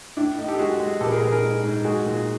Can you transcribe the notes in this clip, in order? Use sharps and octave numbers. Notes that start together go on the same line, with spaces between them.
A2 D4 E4
A2 D#4
G4 A4
G#3 F#4 G#4
G#3
A#1 G4 A4
B4
G#4 A#4
A#1 G#4 A#4
G#4 A#4
G#2
G#2
G#3 F#4 G#4
A#2